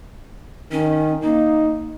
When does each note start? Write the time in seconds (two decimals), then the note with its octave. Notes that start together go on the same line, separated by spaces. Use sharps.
0.72 D#3 C#4
1.23 A#3 D#4